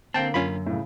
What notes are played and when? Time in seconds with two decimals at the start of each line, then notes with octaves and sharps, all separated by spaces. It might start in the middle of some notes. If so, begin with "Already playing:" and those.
0.14 D3 A#3 C4 G5 A5
0.34 F#2 C#4 F4 B5
0.66 A2 C#3